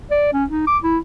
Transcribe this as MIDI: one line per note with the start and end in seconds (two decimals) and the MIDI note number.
0.10 0.30 74
0.33 0.45 61
0.50 0.66 63
0.67 0.77 86
0.83 0.98 64